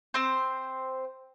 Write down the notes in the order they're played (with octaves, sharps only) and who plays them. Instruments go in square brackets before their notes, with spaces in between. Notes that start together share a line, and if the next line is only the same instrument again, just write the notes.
[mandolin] C4 C5